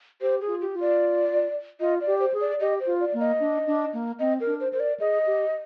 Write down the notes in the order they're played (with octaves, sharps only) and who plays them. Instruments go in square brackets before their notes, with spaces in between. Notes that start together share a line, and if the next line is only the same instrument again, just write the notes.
[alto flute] G4 [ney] C5
[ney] G#4
[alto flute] F4
[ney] G4
[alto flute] F4
[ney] D5
[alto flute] F4 [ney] D#5
[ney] D5
[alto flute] G4
[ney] C5
[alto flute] G#4
[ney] D5
[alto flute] G4 [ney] D#5
[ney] C5
[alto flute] F4
[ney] D5
[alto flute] A#3
[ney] D#5
[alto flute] D4
D4
A#3
[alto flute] C4 [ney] D#5
[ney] A#4
[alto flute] D4
[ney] C5
[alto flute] A#4 [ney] C5
[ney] D5
[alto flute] G#4 [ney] D#5
[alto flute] G4